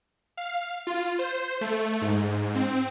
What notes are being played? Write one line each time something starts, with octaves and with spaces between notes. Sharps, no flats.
F5
F4
C5
A3
G#2
C4